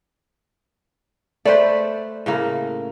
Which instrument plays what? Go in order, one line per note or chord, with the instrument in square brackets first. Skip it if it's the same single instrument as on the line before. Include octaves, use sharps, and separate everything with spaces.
[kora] A3 B4 [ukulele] C5 D5
[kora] A2 C#3 A#3